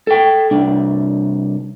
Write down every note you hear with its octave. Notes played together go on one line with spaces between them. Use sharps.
A4 G5
C2 D4